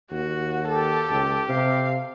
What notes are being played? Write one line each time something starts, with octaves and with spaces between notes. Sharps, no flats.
D#2 F#4
G4 A4
C#2
C3 F5